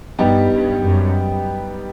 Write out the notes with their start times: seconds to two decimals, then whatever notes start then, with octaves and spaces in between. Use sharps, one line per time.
0.19 G2 G3 B3 D#4 G4
0.52 G2
0.84 F#2